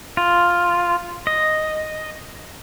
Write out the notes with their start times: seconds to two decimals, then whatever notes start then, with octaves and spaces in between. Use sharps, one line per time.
0.17 F4
1.27 D#5